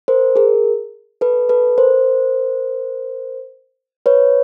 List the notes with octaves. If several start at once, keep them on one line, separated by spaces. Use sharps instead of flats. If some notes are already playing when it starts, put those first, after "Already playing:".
A#4 C5
G#4 A#4
A4 B4
A4 B4
A#4 C5
B4 C#5